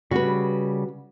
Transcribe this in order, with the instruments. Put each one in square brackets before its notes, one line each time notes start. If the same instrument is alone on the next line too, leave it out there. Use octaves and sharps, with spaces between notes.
[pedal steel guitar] C#3 G3 [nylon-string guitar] F#4 B4